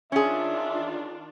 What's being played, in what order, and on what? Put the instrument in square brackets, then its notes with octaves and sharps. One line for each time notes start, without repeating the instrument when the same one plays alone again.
[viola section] D#3 D4 F4 [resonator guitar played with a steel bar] C#4 G#4 [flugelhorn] E5